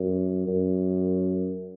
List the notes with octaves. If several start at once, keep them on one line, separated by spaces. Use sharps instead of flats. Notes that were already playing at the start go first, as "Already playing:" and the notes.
Already playing: F#2
F#2